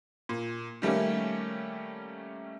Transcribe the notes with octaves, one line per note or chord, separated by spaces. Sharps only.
A#2
D#3 G3 A3 A#3 C#4